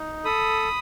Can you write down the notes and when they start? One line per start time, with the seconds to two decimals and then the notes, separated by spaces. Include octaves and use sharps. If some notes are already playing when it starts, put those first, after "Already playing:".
Already playing: D#4
0.25 A4 B5 D#6